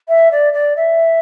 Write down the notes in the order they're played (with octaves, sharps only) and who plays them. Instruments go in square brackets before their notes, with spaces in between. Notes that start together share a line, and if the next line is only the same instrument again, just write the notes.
[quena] E5
D5
D5
E5